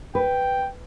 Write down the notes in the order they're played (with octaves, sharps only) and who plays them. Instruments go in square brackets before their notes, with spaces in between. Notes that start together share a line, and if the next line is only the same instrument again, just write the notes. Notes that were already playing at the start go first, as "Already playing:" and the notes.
[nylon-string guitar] B4 [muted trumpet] G5